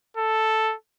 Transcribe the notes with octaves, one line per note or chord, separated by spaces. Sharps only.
A4